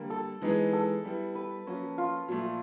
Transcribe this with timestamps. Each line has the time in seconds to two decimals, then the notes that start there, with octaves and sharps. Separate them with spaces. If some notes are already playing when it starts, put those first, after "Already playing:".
Already playing: D3 G3 A#3
0.10 A4
0.41 E3 G#3 B3 D#4 G#4
0.73 A4
1.05 G3 B3 E4
1.35 B4
1.67 F3 A#3 C#4 F#4
1.98 F4
2.28 A#2 F3 A3